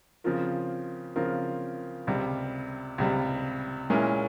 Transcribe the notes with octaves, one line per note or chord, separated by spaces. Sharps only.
C#3 F3 C4 F4 A#4
C#3 F3 C4 F4 A#4
C#2 C3 G3
C#2 C3 G3
A#2 G#3 C#4 E4 A#4